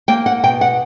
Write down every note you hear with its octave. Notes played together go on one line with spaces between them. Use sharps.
A#3 G5
F#5
B2 G5
F#5